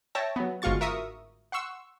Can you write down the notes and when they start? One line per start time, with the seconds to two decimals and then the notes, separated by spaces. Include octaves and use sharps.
0.15 C#5 E5 G5 A5 A#6
0.36 F#3 B3
0.62 G1 G#2 F4 F#4 C#6 A6
0.81 A#4 E5 C#6 D#6
1.52 F#5 C6 C#6 E6